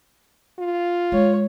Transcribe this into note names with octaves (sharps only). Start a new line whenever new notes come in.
F4
G#3 C#5